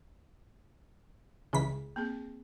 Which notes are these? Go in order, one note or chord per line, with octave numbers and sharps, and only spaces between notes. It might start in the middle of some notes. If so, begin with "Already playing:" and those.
C#2 E3 G#4 B6
A#3 C4 G#4